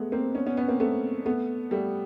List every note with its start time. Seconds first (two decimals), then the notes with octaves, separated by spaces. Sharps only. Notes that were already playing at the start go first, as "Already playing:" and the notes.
Already playing: G#3 A3 B3
0.12 A#3 C4
0.34 B3 C#4
0.46 B3 C#4
0.57 B3 C#4
0.68 A#3 C4
0.80 A3 B3
1.26 A3 B3
1.71 G3 A3